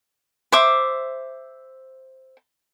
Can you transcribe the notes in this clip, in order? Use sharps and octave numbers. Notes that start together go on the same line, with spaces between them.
C5 E5 D6